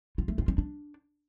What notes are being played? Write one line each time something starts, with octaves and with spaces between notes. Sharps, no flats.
F4
A3
F4
C4
D4